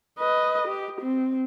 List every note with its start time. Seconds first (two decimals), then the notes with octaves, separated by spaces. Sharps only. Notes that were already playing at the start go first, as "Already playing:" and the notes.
0.19 B4 D#5
0.68 G4
1.01 C4